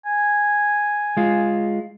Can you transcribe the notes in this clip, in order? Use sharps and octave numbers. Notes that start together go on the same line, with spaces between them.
G#5
G#3 F4